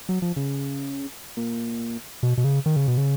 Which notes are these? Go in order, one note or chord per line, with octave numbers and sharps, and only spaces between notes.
F#3
F3
C#3
A#2
B2
B2
C#3
D#3
C#3
B2
C#3